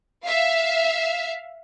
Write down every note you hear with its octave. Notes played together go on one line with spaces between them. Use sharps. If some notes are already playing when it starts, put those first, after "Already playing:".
E5 F5